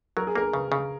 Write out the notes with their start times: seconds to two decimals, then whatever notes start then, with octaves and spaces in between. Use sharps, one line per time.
0.17 F#3 A#4
0.27 G#4
0.35 A#3 A#4
0.53 C#3 B4
0.72 C#3